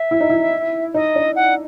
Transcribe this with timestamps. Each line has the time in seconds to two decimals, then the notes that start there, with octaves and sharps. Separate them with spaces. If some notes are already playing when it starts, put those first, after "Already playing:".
Already playing: E5
0.11 E4
0.21 D#4
0.30 E4
0.94 D#4 D#5
1.15 D4
1.36 F#5